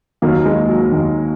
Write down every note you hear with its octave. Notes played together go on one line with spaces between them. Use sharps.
D#2 D#3 F#3 A#3
G#3
F#3
D#2 D#3